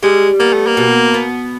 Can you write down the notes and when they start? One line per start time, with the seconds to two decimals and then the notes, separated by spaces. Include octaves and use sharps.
0.03 G3 G#3
0.39 A#3 B3
0.53 A3
0.67 A#3
0.77 B2
1.14 B3